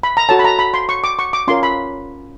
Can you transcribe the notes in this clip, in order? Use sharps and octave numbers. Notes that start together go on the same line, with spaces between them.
B5
A#5
F#4 A4 C#5 A5
B5
A#5
B5
C6
C#6
D6
C#6
D6
C#4 F4 A#4 C#5 C6
B5